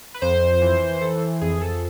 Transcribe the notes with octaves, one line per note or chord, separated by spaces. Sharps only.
B4
F2 C5
E3
E3 A4
F2 G#4
A4